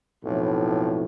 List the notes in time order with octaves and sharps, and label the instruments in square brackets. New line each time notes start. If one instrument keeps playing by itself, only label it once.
[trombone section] B1 F2 A2